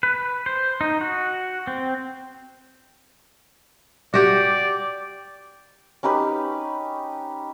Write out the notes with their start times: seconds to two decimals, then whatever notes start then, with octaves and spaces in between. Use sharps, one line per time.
0.03 B4
0.46 C5
0.81 D#4
1.01 F#4
1.67 C4
4.14 F#4 G4 D5
6.03 C#4 D#4 G4 B4